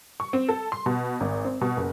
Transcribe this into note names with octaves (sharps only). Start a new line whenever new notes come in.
C#6
C4
A4
C6
B2
G#1
C4
B2
F#1